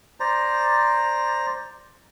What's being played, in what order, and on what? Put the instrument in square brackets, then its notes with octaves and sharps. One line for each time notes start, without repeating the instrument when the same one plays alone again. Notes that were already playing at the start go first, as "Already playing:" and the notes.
[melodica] C5 D5 A#5